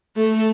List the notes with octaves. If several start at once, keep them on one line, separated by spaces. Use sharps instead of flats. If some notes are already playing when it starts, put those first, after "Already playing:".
A3